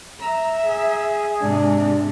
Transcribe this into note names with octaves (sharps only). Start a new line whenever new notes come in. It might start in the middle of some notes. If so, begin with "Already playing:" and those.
E5 A#5
G#4
G#2 C3 D4